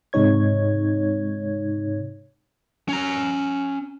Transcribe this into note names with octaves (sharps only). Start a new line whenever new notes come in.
G#2 C3 G#3 D#4 C#5 G#6
C#4 A#5